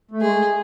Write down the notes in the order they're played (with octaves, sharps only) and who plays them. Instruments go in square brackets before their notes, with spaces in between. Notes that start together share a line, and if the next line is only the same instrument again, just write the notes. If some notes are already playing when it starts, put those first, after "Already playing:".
[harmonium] A3
[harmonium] G#3 [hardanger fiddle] G#4